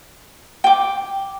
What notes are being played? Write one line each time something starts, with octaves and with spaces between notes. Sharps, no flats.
G5 D6